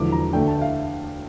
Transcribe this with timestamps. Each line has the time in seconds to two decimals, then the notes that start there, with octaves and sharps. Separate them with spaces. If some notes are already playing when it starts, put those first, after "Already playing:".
Already playing: E1 E2 D3 F3 D6
0.12 A#5
0.33 D2 D3 A3 D4 G5
0.48 A5
0.57 E5
0.61 F5